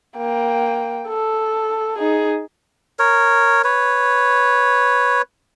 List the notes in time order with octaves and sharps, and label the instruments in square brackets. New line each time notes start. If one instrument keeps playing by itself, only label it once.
[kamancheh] A#3 G5
A4
D#4 G#4
[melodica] A#4 C#5
B4 C#5